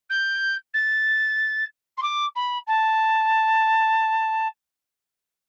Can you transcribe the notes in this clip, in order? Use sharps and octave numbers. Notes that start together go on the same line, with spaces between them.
G6
A6
C6
D6
B5
A5